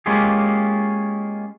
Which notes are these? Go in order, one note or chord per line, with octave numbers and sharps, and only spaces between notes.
G#3 A#3 C#4 F4 G4 G#4